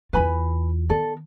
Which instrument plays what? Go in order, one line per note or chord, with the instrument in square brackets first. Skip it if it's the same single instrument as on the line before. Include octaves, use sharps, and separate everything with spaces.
[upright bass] E2 F4 [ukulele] B4 G#5 B5
[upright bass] D#3 B3 [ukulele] A4 D5